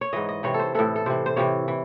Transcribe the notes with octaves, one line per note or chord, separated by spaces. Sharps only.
C#5
G#2 E3 D#5
D#5
C3 E3 C#5
A4
C5
A2 E3 A4
A4
C3 E3 C5
C5
C3 E3 C#5
E3